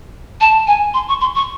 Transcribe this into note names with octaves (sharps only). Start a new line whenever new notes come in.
A5
G#5
C6
C#6
C6
C#6